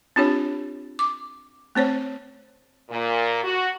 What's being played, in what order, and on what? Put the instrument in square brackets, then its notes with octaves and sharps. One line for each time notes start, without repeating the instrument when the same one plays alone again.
[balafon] C4 D4 F4 G4 C#5
D6
A3 C4 C5 C#5
[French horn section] A#2
F#4